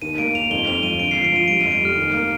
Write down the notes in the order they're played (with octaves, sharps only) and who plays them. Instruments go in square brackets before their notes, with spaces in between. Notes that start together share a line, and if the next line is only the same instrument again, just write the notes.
[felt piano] D#2 [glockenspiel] D#7
[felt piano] A#3 [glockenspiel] D7
[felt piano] D#2 [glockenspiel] F7
[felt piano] F2 [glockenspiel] G7
[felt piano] C4 [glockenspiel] F7
[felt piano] F3 [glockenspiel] D#7
[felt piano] D3 [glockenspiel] D7
[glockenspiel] C7
[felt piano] F3
[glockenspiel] D7
[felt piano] F3 [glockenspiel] D#7
[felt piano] G3 [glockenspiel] D7
[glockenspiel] D#7
[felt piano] F2
[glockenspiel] D7
[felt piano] G3 [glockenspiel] F6
[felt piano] D#2
A#3